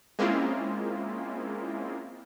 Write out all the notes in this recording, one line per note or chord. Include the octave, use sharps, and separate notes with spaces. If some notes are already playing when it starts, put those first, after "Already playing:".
G#3 A#3 C4 C#4 E4 F4